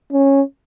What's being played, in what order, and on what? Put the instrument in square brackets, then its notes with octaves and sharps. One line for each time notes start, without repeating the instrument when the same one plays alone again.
[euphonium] C#4